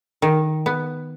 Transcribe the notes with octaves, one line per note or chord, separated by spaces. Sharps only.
D#3
B3